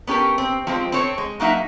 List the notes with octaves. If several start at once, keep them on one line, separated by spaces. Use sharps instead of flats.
B3 C#4 G4 A4 A#4
C4
F3 G#3 C4
C4 A4 C5 C#5
G#3
F#3 A#3 D#4 E5 F#5